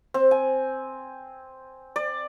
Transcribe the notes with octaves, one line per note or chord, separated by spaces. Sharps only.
C4
G#5
D5